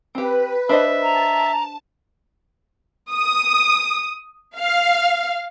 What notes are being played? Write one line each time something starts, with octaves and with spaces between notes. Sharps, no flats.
C4 G4 B4
D4 C5 D#5 E5
A5 A#5
D#6
F5